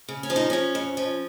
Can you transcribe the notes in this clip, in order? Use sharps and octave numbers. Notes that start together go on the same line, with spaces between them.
C#3
C#4
F3
D#4
F3 C#4
F2
F3